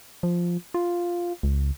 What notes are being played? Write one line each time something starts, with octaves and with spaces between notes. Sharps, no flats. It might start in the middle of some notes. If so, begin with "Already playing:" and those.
F3
F4
C#2